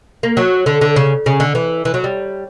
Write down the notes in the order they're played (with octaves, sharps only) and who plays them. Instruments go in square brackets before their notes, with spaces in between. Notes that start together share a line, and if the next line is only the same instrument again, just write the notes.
[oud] A#3
F#3
D3
D3
C#3
C#3
D3
E3
E3
F#3
G3